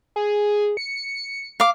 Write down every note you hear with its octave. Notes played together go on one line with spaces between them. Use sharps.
G#4
C#7
F5 D6